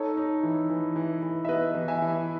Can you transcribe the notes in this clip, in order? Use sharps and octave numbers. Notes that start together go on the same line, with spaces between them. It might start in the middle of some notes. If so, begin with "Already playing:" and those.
Already playing: D#4 A4 C#5
D#4
E3
E3
E3
E3
E5
B3 B4 D#5
E3
E5 G#5
E3